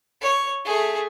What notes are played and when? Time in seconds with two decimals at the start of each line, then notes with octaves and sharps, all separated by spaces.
0.22 C#5
0.65 A3 G#4